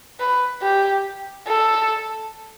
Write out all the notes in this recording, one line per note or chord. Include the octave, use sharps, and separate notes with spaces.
B4
G4
A4